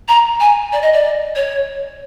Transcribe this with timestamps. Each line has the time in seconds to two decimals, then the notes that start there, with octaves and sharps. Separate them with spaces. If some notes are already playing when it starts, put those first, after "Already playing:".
0.08 A#5
0.40 G#5
0.72 D5
0.82 D#5
0.93 D5
1.35 C#5